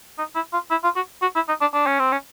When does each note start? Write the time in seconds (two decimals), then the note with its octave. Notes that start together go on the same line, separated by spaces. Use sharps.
0.18 D#4
0.35 E4
0.53 F4
0.71 E4
0.84 F4
0.96 F#4
1.22 F#4
1.35 E4
1.48 D#4
1.61 D4
1.74 D4
1.87 C#4
1.99 C4
2.12 C#4